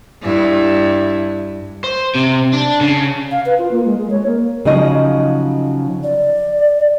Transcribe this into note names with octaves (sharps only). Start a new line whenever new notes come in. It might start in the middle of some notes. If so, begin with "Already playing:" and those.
G2 E4
C5
C3
D4
C#3
F5
B4
F4
A#3
G#3
G#3
C#5
A#3
C#3 F3 F#3 D#4 D#5
D5